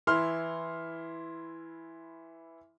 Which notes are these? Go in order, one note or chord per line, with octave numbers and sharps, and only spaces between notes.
E3 E4 C6 F6